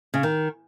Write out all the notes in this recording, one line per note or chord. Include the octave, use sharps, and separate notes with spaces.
C#3
D#3